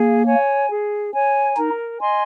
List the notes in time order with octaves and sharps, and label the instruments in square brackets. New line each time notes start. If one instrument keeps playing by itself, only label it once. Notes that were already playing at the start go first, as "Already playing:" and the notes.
Already playing: [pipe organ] A#3 [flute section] G#4
[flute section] C#5 G#5
G#4
C#5 G#5
[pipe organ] D#4 [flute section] A#4
[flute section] D#5 G#5 C6